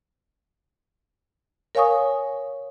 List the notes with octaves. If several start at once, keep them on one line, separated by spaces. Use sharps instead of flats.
A#4 C#5 F5 G#5 C#6 D#6